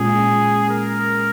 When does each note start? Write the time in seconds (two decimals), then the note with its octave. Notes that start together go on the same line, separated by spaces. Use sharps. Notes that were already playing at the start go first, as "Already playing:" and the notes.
Already playing: A#2 G#3 C#4 F4 G#4
0.70 A#4